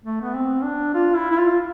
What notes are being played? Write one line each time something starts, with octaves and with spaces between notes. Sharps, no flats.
A3
B3
C4
D4
F4
E4
E4
F4